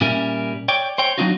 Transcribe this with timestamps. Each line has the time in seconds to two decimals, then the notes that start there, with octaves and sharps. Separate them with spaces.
0.01 A#2 G3 C#4 A#4 E5
0.68 C#5 D5 G5
0.98 C5 C#5 G5
1.18 F#3 C4 D4 D#4 F4 F#4